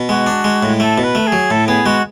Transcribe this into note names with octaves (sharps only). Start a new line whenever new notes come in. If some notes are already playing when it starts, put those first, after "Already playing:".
Already playing: B2
G#3 F#4
D4
G#3
A2
A3 A4
B2
B4
A3
G#4
F#3
A2 A4
B3 G#4
G#3 F#4